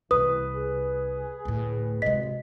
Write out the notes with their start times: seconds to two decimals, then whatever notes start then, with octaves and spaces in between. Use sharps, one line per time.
0.11 C2 B2 E3 B4 D#6
0.55 G#4
1.45 D2 A2
2.02 G#1 C3 G#3 D#5 B6